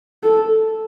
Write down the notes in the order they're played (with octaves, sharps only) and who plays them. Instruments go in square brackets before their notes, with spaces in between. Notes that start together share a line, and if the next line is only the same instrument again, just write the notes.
[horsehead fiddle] A4